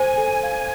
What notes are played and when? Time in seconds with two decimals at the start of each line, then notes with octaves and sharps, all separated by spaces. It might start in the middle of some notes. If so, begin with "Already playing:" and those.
Already playing: A4 C5 G#5
0.18 A4
0.43 F5